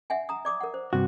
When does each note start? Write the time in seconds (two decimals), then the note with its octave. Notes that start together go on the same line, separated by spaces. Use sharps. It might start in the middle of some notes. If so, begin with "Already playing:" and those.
0.10 E5 F#5 G#5
0.29 A#5 D#6
0.45 D5 D6 D#6
0.60 A#4 F#5
0.74 C5
0.93 G2 C3 F#4